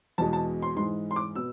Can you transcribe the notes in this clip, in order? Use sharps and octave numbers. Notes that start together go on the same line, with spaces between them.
E2 B2 G#3 A5
A5
C6
G#2 E3 G#3 C6
C6
D6
B2 B3 E6